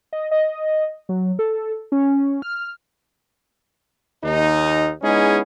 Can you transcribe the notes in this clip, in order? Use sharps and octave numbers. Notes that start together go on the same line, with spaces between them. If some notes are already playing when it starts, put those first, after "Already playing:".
D#5
D#5
F#3
A4
C#4
F6
D#2 D#4
G#3 B3 C#4 D#4 E4 G#4